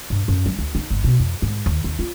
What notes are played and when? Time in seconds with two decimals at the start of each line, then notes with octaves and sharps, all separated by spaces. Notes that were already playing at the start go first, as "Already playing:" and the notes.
0.10 G2
0.28 F#2
0.46 F#3
0.59 D2
0.75 D#4
0.90 G1
1.04 B2
1.19 F2
1.42 G#2
1.66 D#2
1.84 D#2
1.99 F4